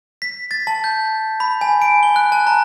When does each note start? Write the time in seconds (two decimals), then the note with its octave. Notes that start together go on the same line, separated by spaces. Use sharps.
0.22 B6
0.51 A6
0.67 A5
0.84 G6
1.40 B5
1.61 G#5
1.82 D7
2.03 G7
2.16 F#6
2.32 A5
2.47 A#5